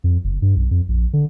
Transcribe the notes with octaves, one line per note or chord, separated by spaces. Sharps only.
F2
F#1
G2
B1
F2
A#1
D3